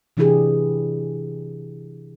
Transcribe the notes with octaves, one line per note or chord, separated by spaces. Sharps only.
C3 E3 D4 E4 G4 G#4